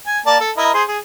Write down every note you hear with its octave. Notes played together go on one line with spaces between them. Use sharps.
G#5
A#3 D5 A5
A4
E4 A#4 D#5
G#4 C5
G#4